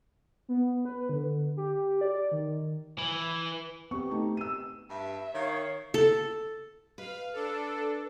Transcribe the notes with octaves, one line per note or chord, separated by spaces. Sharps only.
B3
B4
D3
G4
D5
D#3
E3
B3 C4 G4 C#6
A3 D#4
E6 D#7
G2 E5
D#3 C#5 F5
A4
B4 F5
D4 A4